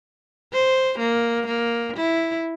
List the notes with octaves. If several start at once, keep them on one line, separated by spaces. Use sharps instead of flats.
C5
A#3
A#3
E4